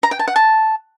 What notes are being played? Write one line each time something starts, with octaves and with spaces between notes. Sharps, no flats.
A#5
G5
A5
F#5
A5